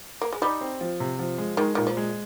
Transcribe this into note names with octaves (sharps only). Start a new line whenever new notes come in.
A#3
G#3
G3 D#4
C4
F3
C3
F3
G#3
D#3 G#3
A#2 D#3
F3
G#3